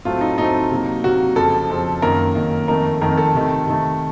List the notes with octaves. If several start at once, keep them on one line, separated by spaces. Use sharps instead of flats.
A2 F#3 A3 C4 F4
D#4
A2 F#3 A3 C4 D#4
C3 F#3 A#3
C3 F#3 A#3 F#4
F2 C#3 F3 C4 A4
F2 C#3 F3 C4
F#2 D#3 A#3 A#4
F#2 D#3 A#3
F2 D#3 A3 A#4
F2 D#3 A3 A#4
A4
C3 D#3 A3
C3 D#3 A3